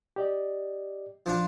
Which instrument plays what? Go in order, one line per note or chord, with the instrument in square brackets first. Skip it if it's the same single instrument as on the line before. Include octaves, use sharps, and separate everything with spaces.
[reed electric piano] G4 D5 D#5
[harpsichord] F3 D4 F4